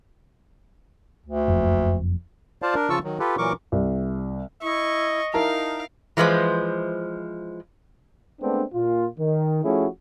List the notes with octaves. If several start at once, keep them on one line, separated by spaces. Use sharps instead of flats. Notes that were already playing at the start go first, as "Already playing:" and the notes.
D2
F#1 F2
F4 C5 D5 F5 A5
D4 A#4
C#3 F3 F4 A5 C#6 E6
D#3 F#3
F4 G4 A4 B4
A#2 E3 F#3 A#4 C#6 D6
C2
E4 D#5 C#6
D#4 E4 A#4 F5 A5
E3 F3 G#3 B4 C5
G#3 A3 B3 C4 D4
A#2 F4
D#3
F3 A3 C#4 E4 F#4 G#4